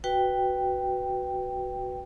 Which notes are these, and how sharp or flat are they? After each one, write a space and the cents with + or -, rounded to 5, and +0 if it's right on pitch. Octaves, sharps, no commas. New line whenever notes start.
F#4 +0 B4 +0 G5 +0